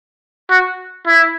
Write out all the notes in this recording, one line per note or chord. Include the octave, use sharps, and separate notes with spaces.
F#4
E4